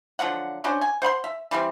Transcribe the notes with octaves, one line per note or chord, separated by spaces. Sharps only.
D3 F3 F#3 F#5
C#4 D4 F#4 C5
G#5
C5 F#5 B5 C6
E5
E3 G3 B3 C4